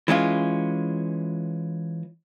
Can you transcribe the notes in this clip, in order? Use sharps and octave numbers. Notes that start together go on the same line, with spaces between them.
E3 G#3 C#4 F4